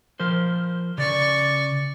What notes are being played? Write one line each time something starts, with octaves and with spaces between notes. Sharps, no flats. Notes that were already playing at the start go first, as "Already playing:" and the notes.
F3 A#4 C5
C#3 D5 C#6